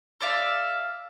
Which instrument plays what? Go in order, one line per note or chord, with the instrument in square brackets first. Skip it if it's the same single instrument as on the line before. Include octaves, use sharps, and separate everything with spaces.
[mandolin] A4 D5 E5 F5